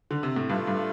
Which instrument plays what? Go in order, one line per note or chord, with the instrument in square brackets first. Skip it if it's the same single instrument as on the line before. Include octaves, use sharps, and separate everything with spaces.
[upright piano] D3
C3
A2
[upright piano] G2 [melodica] A3 F4 A4
[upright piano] G2